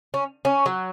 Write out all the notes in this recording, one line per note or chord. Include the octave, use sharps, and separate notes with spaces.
C#4
C#4
F#3